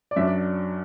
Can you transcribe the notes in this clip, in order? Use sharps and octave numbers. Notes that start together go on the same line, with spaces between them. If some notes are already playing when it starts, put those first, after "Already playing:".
D5
F#2 F#3 D4 E5
D5